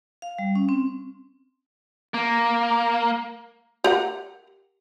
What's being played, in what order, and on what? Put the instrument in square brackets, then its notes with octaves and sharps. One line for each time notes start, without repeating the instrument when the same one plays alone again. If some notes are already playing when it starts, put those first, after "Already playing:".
[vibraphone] F5
G3
C#4
C4
[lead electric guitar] A#3
[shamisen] G4 A#4 F#5